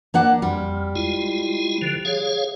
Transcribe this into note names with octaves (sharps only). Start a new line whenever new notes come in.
A#3 D4 F#5
F2 G3
G#3 E4 F4
D3 F3
G#4 C#5 F5